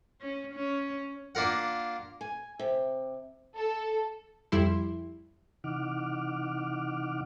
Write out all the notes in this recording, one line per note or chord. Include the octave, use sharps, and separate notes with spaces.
C#4
C#4
A#3 D4 F4 A#4 F#5
G#5
C3
A4
F2 G3 E4 C6
C3 E3 D#4 F#5 D6 F6